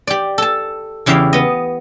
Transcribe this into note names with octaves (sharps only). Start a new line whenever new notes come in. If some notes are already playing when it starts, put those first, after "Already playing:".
G4 D5
A4 A5
E2 C#3 E4 G4 F5 G5
B3 D#5